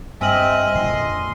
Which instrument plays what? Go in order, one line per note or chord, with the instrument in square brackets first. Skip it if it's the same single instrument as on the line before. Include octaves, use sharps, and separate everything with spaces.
[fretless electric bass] G2 [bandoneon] C4 E5 [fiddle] D#5 [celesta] G#5 F6 F#7
[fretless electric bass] F2 A#2 D3 [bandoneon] C6